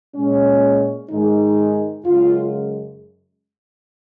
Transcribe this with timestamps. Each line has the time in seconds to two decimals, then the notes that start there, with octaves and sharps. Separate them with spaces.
0.16 A#2 G#3 C#4
1.10 G#2 D#3 G#3 D#4
2.06 F#2 C#3 G#3 F4